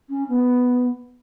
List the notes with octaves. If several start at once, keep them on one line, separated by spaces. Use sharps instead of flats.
C#4
B3